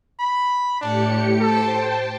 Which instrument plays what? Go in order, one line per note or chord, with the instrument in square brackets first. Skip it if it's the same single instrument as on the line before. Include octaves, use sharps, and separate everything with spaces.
[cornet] B5
[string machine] A2 G4 C#7 [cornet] D4
[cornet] A4 [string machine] C5 G5 A5